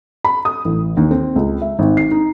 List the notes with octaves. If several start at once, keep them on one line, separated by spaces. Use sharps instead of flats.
B5
D#6
A1
D#2
C4
C#2
E5
G#1
C7
D#4